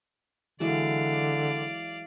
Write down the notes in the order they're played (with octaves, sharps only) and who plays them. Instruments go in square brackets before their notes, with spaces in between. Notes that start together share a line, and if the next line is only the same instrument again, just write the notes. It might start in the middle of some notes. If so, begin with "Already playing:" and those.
[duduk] D3 [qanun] E3 F#3 G#3 [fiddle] D5 F5